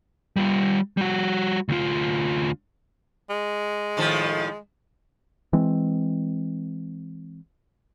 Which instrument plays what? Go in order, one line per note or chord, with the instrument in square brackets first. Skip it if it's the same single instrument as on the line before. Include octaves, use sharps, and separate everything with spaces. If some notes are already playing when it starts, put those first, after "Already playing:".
[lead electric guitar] G3 F4
G3 F#4
D2 F4
[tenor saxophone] G#3
[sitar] A2 D#3 F3
[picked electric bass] E3 G#3 C4